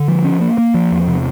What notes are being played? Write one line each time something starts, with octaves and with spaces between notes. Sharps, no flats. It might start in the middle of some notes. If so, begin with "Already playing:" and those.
Already playing: D3
F3
C#4
A#3
A#3
F3
E2
C3